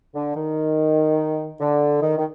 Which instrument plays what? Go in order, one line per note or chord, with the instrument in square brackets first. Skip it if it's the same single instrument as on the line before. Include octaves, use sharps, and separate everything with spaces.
[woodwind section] D3
D#3
D3
D#3
D#3